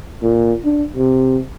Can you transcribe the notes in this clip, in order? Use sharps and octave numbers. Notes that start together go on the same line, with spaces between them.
A#2
D4
C3